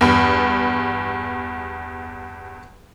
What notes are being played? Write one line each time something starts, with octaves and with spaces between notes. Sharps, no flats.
E2 G2